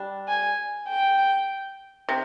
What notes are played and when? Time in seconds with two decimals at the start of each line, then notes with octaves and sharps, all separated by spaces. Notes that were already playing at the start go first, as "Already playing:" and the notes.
Already playing: G3 D4
0.28 G#5
0.89 G5
2.09 C3